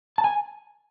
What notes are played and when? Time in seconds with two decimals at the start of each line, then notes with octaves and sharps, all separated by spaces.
0.18 A5
0.24 G#5